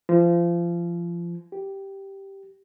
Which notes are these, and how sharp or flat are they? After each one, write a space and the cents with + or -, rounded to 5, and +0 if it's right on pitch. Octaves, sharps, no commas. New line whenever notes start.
F3 -30
G4 -5